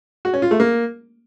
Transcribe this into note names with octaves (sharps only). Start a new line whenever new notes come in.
F#4
C#4
F4
A3
A#3